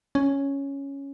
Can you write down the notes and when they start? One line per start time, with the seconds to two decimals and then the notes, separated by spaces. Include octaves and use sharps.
0.15 C#4